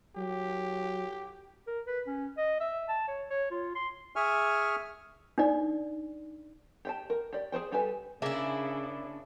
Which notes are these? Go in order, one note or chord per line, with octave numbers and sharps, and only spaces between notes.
F#3 G4
A#4
B4
C#4
D#5
E5
A5
C#5
C#5
F4
C6
G#4 E5 G#5 C#6 F6
D4 D#4 D5
G4 G5 A5
A#4
G4 D5
G#4 A#4 C5 G5
G3 G4 A4 B4 G#5
C#3 A#3 D4 E4 G#4 E5